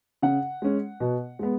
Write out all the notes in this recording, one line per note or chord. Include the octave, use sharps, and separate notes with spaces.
C#3 F#5
G#3 C#4
B2
G#3 B3